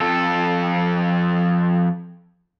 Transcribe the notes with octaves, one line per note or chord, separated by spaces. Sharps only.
F2 A4